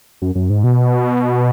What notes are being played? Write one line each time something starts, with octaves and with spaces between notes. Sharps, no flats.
F#2
F#2
G#2
B2